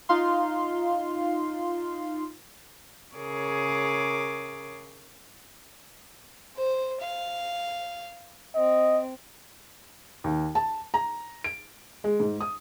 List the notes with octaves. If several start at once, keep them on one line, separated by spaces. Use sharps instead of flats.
D#4 F4 F5 C6
C#3 G#4 A#4 C#5 D6
C5
F5
C4 D#5
D#2
A5
A#5
D7
G#3
G#2
D#6